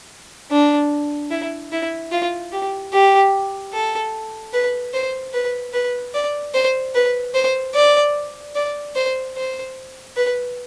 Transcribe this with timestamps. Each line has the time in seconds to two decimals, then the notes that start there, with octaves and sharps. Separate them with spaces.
0.51 D4
1.31 E4
1.72 E4
2.12 F4
2.52 G4
2.93 G4
3.73 A4
4.53 B4
4.94 C5
5.34 B4
5.74 B4
6.14 D5
6.54 C5
6.95 B4
7.35 C5
7.75 D5
8.55 D5
8.96 C5
9.37 C5
10.17 B4